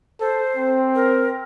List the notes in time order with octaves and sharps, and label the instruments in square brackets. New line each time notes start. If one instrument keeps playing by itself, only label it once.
[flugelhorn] A4 [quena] C5
[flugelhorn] C4
[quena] A#4